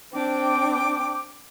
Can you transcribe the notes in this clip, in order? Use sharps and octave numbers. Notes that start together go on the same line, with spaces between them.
C4 D4 G5 D6